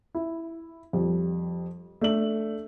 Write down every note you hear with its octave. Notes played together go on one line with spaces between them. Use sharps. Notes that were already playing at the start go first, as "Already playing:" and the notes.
E4
F2 G3
A3 D4 F#7